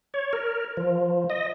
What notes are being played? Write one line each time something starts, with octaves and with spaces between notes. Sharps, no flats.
C#5
A#4
F3
D#5